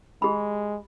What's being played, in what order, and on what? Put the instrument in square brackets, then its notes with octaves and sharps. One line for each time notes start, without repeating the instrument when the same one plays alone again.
[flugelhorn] G#3 [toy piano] G4 B5